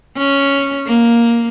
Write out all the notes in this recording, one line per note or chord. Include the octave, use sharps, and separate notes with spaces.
C#4
A#3